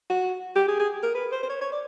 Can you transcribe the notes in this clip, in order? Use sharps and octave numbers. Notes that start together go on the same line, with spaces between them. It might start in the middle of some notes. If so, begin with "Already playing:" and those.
F#4
G4
G#4
G#4
A#4
B4
C5
C5
C#5
C#5
D5